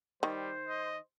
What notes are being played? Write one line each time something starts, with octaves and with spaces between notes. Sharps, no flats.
D#3 G3 C5
D#5